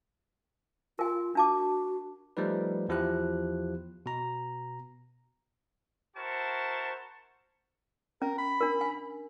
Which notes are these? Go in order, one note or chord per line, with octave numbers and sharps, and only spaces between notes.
F4 A#4 G#5
D4 F#4 A5 D6
F3 G3 A3 D#4 B4
E2 F3 E4 G4 F#6
B2 A#5
E4 F#4 A#4 C5 A5 C#6
C#4 A#4
B5
D4 A#4
G#5